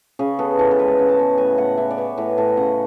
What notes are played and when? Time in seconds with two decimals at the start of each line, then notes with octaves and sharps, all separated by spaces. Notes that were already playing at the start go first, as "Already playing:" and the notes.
0.19 C#3 G#4
0.39 B3 A4
0.59 E3 A4
0.71 A4
0.79 G#3 B4
0.99 C#3
1.09 A5
1.19 B3
1.38 A2 G#5
1.58 A2 F#5
1.77 E3 E5
1.91 D5
1.98 B3 C#5
2.18 A2 B4
2.38 A2 A4
2.57 C#3 F#5